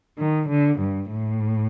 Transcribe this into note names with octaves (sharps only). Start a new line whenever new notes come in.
D#3
D3
G2
A2